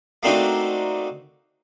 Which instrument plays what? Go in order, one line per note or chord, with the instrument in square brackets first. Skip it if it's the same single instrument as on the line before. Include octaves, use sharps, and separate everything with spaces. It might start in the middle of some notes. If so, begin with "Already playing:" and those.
[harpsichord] A3 A#3 C4 D4 D#4 F#4